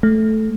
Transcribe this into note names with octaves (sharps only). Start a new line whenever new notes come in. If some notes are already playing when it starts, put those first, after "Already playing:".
A3